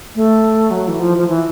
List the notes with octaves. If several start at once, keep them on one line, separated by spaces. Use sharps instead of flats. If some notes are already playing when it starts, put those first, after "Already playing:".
A3
F#3
E3
F3
F3
E3